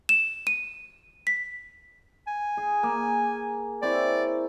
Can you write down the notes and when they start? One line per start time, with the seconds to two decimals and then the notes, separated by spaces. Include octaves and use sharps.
0.09 E7
0.47 D#7
1.27 B6
2.27 G#5
2.57 G#4
2.83 A#3
3.83 C4 E4 C#5 D5